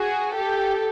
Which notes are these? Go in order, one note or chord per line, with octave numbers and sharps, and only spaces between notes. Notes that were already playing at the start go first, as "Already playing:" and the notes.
Already playing: F#4 G#4
G4 A4